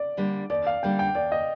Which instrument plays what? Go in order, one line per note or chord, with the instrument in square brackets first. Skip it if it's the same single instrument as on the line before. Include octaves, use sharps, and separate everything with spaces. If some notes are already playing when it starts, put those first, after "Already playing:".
Already playing: [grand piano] D5
[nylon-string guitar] D3 G3 A#3 D4
[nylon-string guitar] D#2 [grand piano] D5
[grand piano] F5
[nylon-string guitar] D3 G3 A#3 D4 [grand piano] G5
[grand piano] G5
[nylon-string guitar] D#2 [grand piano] D5
[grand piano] D#5